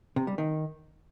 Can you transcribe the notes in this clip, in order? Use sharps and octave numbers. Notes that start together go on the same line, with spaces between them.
C3
G3
D#3